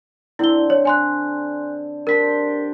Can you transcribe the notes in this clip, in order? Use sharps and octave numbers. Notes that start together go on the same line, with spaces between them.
D3 C4 E4 D5 G7
C#5
G#5 C6 F#6
D4 G4 A#4 C5 B6